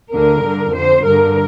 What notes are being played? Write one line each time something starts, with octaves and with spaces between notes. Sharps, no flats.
D2 D3 A#4
G2 D3
F2 D3 C5
G2 D3 A#4